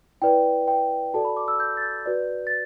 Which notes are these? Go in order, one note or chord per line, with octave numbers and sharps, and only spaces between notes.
E4 B4 D5 G5
G5
F#4 A4 D5 A5
B5
D6
E6
G6
A6
G6
F#4 B4 D5
A6